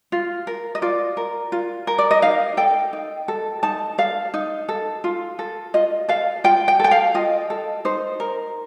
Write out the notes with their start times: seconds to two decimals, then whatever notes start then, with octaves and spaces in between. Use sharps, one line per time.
0.12 F4
0.47 A#4
0.75 D#5
0.82 F4 D5
1.17 A#4
1.52 F4
1.87 A#4
1.98 D5
2.11 D#5
2.22 D#4 F5
2.57 A4 G5
2.93 D#4
3.28 A4
3.63 D#4 A5
3.98 A4 F5
4.34 D#4
4.69 A4
5.04 F4
5.39 A4
5.74 F4 D#5
6.09 A4 F5
6.44 F4 G5
6.68 G5
6.80 A4 G5
6.91 F5
7.14 F4 D#5
7.50 A4
7.85 D#4 C5
8.20 A#4